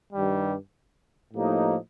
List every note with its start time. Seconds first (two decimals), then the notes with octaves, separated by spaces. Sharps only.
0.13 G2 D#3 G3
1.33 A2 F3 A#3 D#4 G4